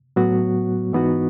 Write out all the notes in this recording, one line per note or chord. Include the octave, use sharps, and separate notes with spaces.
A2 F#3 B3 F#4
G#2 E3 B3 D#4 F#4